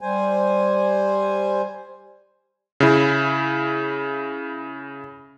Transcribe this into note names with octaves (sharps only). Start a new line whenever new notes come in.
G3 C5 G#5
C#3 E4